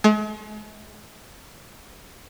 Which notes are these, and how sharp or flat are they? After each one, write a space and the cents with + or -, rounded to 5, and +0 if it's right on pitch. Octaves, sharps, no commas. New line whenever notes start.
G#3 +45